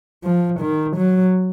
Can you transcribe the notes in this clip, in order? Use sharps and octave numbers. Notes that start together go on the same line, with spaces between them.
F3
D#3
F#3